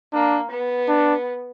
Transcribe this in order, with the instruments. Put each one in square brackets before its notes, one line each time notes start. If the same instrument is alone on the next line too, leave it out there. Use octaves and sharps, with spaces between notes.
[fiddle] A#3 [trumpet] D4
[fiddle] B3
[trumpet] D4